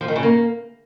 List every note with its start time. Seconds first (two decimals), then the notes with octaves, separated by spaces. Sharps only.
0.01 F3
0.08 D#3
0.16 C#3
0.23 A#3